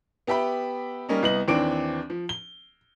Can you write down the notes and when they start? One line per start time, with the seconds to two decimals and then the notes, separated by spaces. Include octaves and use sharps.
0.27 B3 G4 E5 G5 B5
1.09 G3 A#3 C#4 D#4
1.23 C2 B3 D#5 F#7
1.48 D#2 E3 C4 D4 D6 D7
2.10 F3
2.29 G7